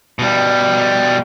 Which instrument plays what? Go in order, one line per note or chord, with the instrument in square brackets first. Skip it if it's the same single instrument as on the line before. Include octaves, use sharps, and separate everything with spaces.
[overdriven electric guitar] B2 G3